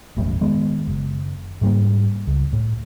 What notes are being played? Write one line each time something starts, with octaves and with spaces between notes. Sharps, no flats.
E1 A1 F#2 A3
D#3 G#3 B3
F#1
G#2 G3 A#3
C#2
A2